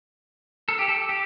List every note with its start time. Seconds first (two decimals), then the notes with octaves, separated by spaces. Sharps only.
0.69 A4
0.79 G4
0.88 A4
1.09 G4